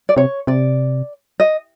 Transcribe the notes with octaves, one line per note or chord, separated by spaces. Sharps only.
D5
C3 C#5
C3 D5
D#5